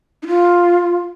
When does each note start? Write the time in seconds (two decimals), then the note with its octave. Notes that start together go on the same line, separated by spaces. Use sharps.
0.23 D#4
0.27 F4